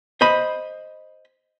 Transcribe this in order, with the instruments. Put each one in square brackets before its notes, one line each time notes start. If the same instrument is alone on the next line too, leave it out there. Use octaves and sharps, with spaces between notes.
[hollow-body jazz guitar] C5 D#5 B5